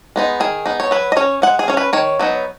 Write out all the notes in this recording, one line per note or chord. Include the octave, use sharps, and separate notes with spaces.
G#3 B3 D#4
D#3 G#4
B3 D#4
C#5
F#3 B4
D#5
C#4 C#5
G#3 F#5
G#4
C#4 C#5
B4
D#3 C#5
F#3 B3 D#4